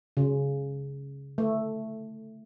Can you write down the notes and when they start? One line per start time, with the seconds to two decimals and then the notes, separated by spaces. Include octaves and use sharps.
0.17 C#3
1.38 A3